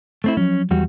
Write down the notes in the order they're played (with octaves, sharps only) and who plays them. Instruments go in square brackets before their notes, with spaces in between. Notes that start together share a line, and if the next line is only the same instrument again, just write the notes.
[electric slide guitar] A3 C4 E4
[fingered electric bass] F3 F#3 [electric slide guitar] C#4
[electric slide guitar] E2 G3 F#4